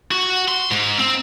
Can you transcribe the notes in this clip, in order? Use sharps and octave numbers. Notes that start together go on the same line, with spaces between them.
F#4
C6
G#2
C4